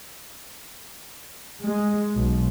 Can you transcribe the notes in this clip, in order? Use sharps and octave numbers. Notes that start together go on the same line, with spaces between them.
G#3
B1